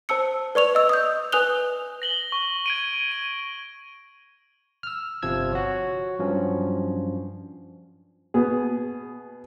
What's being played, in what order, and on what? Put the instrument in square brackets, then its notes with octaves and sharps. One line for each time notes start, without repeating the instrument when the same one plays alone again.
[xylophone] C5 A5 E6 C#7
B4 D5 C#6 F7
D#5 E6
D#6 G6
B4 G#5 D#6 F#6 F7 G7
[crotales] A#6 F#7 G7
C#6
G#6 D7 D#7
D#7
[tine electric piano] E6 F6
G1 C3 F3 E6 G#6
F#4 C#5
G2 F3 F#3 C#4
[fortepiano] B2 B3 G#4